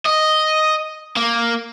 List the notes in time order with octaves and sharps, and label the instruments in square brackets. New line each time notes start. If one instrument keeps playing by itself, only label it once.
[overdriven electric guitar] D#5
A#3